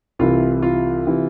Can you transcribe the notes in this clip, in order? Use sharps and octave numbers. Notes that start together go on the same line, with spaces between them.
C2 C3 E3 F4
F4
C3 E3